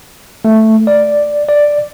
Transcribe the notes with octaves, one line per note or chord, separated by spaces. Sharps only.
A3
D5
D5